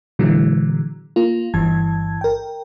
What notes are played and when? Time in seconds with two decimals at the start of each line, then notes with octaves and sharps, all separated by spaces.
0.19 A#2 D3 E3 F#3 G#3
1.16 A#3 F4
1.54 G1 G2 E3 A5 G#6
2.21 A#4 G5